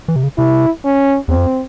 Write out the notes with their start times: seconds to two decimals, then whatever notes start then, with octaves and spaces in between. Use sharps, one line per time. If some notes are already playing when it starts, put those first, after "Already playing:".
0.08 E3
0.16 C3
0.23 C#3
0.38 C3 E4
0.85 C#4
1.28 E2 C4
1.37 F2